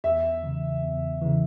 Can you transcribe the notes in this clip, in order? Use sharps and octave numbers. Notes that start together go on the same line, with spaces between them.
E2 E5
C#3 E3
E2
C#3 E3